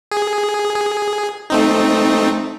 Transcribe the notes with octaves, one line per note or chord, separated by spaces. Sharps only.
G#4
G#4
A3 C4 D#4